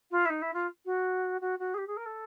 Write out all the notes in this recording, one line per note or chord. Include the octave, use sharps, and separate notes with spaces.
F4
E4
D#4
E4
F4
F#4
F#4
F#4
G#4
G4
G#4
A#4
A4